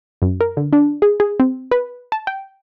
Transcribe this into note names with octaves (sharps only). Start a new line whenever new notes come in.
F#2
A#4
D3
D4
G#4
G#4
C4
B4
A5
G5